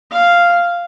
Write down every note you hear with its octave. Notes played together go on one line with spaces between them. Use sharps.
F5